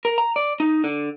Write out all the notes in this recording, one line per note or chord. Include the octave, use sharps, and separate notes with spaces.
A#4
A#5
D5
D#4
D3